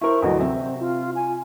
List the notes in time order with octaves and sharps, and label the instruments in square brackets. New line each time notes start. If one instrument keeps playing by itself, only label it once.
[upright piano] E4 A#4 C5 [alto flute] C#6
[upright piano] D2 E3 F#3 [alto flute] D#5
[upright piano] C3 E5 [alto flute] C4
[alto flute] F4
G#5